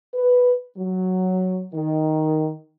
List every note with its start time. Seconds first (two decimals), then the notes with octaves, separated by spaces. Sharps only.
0.14 B4
0.77 F#3
1.74 D#3